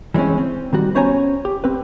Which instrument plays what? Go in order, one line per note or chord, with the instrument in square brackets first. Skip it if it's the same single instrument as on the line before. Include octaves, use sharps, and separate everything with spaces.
[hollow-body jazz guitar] E3 G3 G#3 C4 C#4
C4
D#3 G3 F#4
B3 C#4 C5 C#5 G#5 A#5
G4
C4 B4